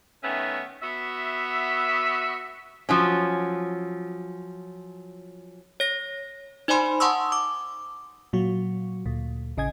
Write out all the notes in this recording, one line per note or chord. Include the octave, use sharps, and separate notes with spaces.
D#3 A3 B3 C#4 E5
B3 F#4 E5
F3 F#3 C#4
C#5 A#6
D#4 C5 D5 G#5 B5 C6
F#5 A5 C6 C#6 D#6 E6
D6
A#2 F#3 F#4
D2 A#2
A1 C#3 D#5 G#5 G#6